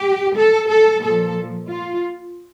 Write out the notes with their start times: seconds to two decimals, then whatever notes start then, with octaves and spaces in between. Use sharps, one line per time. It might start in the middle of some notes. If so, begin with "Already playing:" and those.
Already playing: G4
0.36 A4
0.69 A4
1.02 A#2 F3 A4
1.69 F4